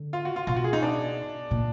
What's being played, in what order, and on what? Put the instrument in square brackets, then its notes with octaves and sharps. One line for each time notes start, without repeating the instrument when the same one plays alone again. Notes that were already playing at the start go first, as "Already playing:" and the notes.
Already playing: [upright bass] D3
[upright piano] F4
F#4
F4
[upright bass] B2 [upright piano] F4
[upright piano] F#4
G#4
D#4
D4
[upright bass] A#2